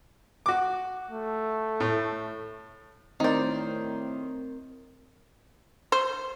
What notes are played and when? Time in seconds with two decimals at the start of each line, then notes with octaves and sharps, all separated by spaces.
0.46 F#4 D6
1.11 A3
1.80 A2
3.20 A2 D#3 C4 D#4 A#4 C5 D5
5.92 C5